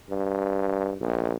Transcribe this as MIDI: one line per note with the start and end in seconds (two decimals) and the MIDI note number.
0.10 0.95 43
1.01 1.34 34